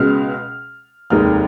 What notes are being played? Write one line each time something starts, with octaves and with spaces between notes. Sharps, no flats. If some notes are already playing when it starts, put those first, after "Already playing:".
Already playing: C#2 B2 G#3 F6
F1 D#2 D#3 G#3 F6